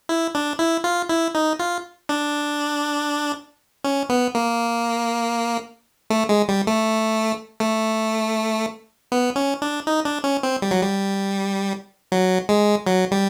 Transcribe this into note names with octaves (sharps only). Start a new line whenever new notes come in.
E4
D4
E4
F4
E4
D#4
F4
D4
C#4
B3
A#3
A3
G#3
G3
A3
A3
B3
C#4
D4
D#4
D4
C#4
C4
G3
F#3
G3
F#3
G#3
F#3
G3